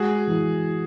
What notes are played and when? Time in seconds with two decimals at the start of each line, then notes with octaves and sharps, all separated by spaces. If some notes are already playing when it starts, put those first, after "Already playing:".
Already playing: G#3 F#4 G#4
0.27 E3